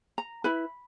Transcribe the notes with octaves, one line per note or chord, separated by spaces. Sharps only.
A#5
E4 B4 B5